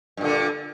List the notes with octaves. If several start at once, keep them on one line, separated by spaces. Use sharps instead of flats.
G2 A#2 D3